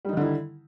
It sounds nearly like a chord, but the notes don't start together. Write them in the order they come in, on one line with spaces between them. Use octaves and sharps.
G3 D#4 D#3 D3 E4